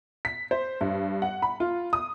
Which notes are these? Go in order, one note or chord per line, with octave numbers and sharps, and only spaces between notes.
B6
C5
G2
F#5
B5
F4
D#6